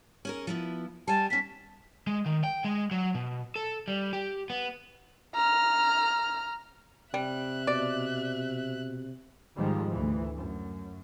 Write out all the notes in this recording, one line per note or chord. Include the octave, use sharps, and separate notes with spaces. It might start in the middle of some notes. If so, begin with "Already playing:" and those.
C#4 G#4 A#4
F3 B3 E4
G3 G#5 A5
B3 C#4 B6
G#3
D#3
G5
G#3
F#3
B2
A4
G3
G4
B3
A#5 F6
C3 G3 E5 F#6
B2 D5
G#2 D#3 F3 G3 G#3
D2 E3
F#2